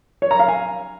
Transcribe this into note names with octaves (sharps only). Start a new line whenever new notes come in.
C#5
A#5
F5
G#5